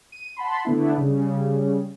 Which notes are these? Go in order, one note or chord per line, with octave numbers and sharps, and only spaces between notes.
D#7
F#5 A5 B5 C6
D3 A3 B3 D4 E4
C#3 G3